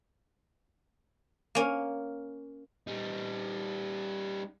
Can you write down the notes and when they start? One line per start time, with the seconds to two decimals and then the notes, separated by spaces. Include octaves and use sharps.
1.55 A#3 C#4
2.87 G3 D#4